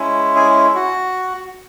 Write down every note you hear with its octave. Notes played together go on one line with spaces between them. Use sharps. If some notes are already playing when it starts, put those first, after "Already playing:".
Already playing: G#3 C#4 E4
G#4
F#4